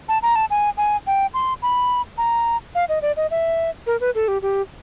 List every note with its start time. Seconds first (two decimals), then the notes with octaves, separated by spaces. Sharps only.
0.09 A5
0.22 A#5
0.35 A5
0.50 G#5
0.77 G#5
1.07 G5
1.34 C6
1.62 B5
2.18 A#5
2.75 F5
2.89 D#5
3.02 D5
3.17 D#5
3.31 E5
3.87 A#4
4.00 B4
4.15 A4
4.28 G4
4.42 G4